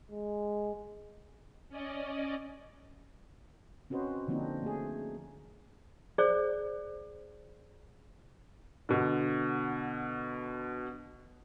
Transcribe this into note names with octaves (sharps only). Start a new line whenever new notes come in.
G#3
C#4 D5 D#5
C4 C#4 F#4 B4 C5 D#5
D3 F3 A#3 C4 D4 D#4
A3 G#4
G#4 C5 D5
B2 D3